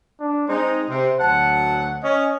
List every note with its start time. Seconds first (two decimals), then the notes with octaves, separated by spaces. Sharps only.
0.20 D4
0.48 G#3 C4 D#4 C5
0.88 C3 C5
1.20 D2 F#3 F#5 A5
2.03 C#4 D#5